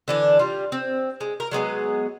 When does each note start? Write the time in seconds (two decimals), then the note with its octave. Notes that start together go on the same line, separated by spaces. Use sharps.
0.08 D3 E3 D4
0.39 G3 F4
0.72 C4
1.21 G#3
1.40 A#4
1.51 F#3 G#3 B3 G#4